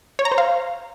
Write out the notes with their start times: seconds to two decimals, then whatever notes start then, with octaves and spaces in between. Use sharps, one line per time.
0.19 C#5
0.25 A#5
0.32 C5
0.38 F5